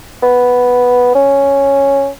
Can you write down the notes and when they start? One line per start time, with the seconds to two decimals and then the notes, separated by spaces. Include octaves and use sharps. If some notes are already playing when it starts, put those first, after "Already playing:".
0.23 B3
1.15 C#4